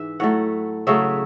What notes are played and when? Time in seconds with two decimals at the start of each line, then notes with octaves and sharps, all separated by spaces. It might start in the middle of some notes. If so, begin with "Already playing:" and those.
Already playing: G#2 E3 E5
0.20 A2 F#3 A3 F#5
0.87 C#3 F#3 A3 E5